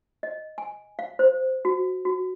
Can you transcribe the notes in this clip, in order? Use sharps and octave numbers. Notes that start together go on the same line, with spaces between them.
D#5
G#5
F5
C5
F#4
F#4